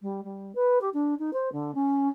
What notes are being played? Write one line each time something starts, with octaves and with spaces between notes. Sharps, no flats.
G3
G3
B4
G4
D4
D#4
C5
D3
C#4